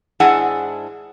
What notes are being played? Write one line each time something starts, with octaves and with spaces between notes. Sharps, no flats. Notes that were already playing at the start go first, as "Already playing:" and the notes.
G#2 D4 E4 G#4 F#5 G#5